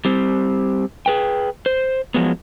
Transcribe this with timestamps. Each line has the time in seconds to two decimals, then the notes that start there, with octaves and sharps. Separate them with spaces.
0.05 G3 C4
1.06 G#4 B4 G5
1.66 C5
2.14 F3 F#3 G#3 B3